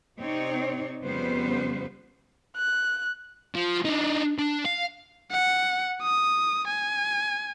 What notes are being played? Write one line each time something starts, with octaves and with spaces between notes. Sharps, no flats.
C3 C4 D#4 C#5 D5
F2 C#3 G3 B3 B4 C5
F#6
F3
D4 D#4
D4
F5
F#5
D#6
G#5